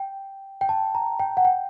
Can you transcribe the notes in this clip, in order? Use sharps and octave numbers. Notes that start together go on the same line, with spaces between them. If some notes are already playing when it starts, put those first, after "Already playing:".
Already playing: G5
G5
A5
A#5
G5
F#5
G5